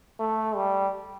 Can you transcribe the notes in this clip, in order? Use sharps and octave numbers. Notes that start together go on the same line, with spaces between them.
A3
G3